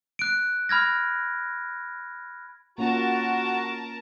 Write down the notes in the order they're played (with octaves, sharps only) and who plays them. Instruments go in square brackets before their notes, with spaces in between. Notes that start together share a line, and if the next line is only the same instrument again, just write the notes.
[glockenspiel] F#6 D7
B5 F6 G#6 A#6
[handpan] A#3 C#4 F4 [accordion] F#4 [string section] A#4 A5 A#5